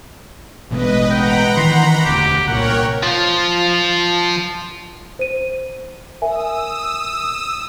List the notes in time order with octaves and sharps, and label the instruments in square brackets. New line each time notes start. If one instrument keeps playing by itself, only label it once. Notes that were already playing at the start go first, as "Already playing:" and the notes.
[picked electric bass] A1 B2 G#3 [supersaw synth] B4 D#5
[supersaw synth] F#5 A#5 B5 [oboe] G5
[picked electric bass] D#3 E3 [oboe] C6
[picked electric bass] E1 D2 [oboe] G4
[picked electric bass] C2 A#2 [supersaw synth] A#4 C#5 G5 [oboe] F#5
[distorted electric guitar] F3 F4
[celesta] C5 D#7
[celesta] A#4 E5 G#5 [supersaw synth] D#6 E6